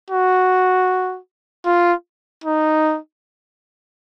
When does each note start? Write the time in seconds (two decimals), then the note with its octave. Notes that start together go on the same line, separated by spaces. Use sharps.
0.10 F#4
1.66 F4
2.44 D#4